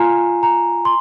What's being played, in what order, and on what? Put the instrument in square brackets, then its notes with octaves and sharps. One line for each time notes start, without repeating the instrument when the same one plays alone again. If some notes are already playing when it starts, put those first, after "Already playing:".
Already playing: [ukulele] F4 [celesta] G#5 A#5
[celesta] A#5
C6